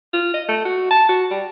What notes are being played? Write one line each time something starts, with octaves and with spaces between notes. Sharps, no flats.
F4
D#5
A3
F#4
A5
F#4
G3